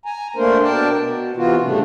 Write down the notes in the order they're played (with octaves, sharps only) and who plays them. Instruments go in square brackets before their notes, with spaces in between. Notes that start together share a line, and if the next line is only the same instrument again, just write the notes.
[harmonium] G#5 A#5
A3 A#3 D4 A#4 C5
B2 D4 A#4 D5 G5 A5
B2
C3 E3 B3 F4 F#4
A2 C#3 G3 A3 D4